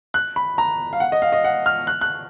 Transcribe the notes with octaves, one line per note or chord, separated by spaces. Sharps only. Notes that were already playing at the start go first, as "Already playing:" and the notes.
F#6
B5
A#5
F5
F#5
D#5
F5
D#5
F#5
F6
F#6
F#6